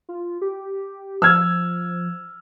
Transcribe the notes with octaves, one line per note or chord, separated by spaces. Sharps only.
F4
G4
F3 E6 F6 G#6